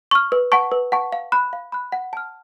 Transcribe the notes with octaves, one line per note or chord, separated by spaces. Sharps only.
C#6 F6
B4
F#5 A5 C#6
B4
F#5 A5 C#6
F5
B5 F#6
F5
B5 F#6
F#5
A5 F6